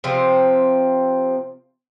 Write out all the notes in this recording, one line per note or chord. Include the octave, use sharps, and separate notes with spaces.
C3 F3 C4